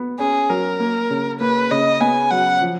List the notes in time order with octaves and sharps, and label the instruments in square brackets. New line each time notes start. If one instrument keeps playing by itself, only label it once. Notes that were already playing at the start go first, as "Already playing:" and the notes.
Already playing: [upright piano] B3
[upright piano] C#4 [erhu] G#4
[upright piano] F#3 [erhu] A#4
[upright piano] A#3
C#3
[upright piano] A#3 [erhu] B4
[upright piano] C#3 [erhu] D#5
[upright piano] B3 [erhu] G#5
[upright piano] F#3 [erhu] F#5
[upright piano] F3